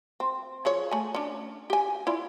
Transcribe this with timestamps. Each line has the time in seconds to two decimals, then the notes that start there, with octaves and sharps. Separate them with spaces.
0.20 C4
0.65 F3 G#4 C#5
0.91 A3 G#5
1.15 C#4 D4
1.70 G4 G#5
2.07 E4 F4 D5